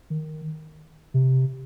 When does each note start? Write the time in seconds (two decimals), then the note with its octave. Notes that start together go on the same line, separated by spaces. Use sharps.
0.10 D#3
1.14 C3